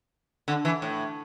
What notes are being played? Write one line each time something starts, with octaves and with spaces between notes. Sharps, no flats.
D3
E3
A2